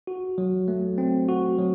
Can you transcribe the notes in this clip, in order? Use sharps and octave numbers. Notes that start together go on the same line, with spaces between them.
F#4
F#3
A3
C4
F#4
F#3